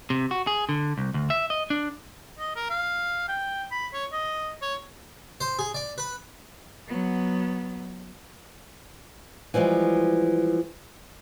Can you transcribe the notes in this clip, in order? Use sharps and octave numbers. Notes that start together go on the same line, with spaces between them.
C3
F#4
G#4
D3
C2
D2
E5
D#5
D4
D#5
A#4
F5
G5
B5
C#5
D#5
C#5
C5
G#4
D5
B4
F#3 B3
E3 F3 G3 G#3